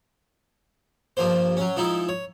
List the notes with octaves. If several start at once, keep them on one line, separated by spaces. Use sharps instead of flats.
G2 F3 A#3 C5
F#3 C#4
F3 G#3 D#4 E4
C#5